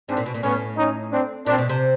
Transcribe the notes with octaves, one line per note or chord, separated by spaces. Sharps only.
G#2 C4 D4
A#2
B2
A#2
A2 B3 C#4
C#4 D#4
C4 D4
A#2 C4 D4
B2
C3